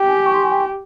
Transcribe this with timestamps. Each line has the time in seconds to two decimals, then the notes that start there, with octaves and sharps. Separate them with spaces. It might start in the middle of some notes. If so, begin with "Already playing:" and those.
Already playing: G4 G5
0.08 G#5
0.26 C#6
0.34 C6
0.44 G#5
0.52 G5